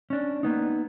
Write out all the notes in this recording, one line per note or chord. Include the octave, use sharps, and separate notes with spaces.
C#4 D4
A#3 B3 D#4